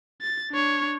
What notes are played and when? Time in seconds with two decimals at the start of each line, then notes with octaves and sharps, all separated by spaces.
0.22 A6
0.51 D4 C#5